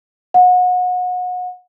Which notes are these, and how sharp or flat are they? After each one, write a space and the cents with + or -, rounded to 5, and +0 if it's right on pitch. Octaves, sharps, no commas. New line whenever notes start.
F#5 -30